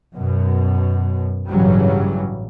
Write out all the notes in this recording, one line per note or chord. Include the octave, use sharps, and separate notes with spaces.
F#2 B2
A1 G2 C#3 E3 F#3 G3